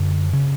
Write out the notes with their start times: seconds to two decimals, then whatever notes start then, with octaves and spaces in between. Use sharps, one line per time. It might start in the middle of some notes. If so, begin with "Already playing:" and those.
Already playing: F#2 D3
0.33 C#3